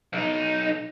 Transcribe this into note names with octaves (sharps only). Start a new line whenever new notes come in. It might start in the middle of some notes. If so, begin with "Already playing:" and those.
B1 D#4